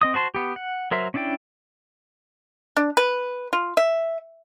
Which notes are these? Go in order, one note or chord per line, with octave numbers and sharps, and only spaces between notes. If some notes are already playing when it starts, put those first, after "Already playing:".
C4 D#5 D#6
F#4 C5 A5 C6
B3 G4
F#5
F#3 A#4 C5 E5
C#4 D4 E4 D5 G5
D4
B4
F4
E5